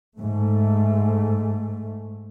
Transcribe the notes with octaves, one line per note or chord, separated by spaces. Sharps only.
G#2 A3